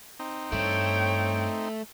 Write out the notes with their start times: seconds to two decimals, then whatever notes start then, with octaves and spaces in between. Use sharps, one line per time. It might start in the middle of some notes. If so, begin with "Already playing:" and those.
0.19 C4 D#4
0.52 G2 A3 C#5 G5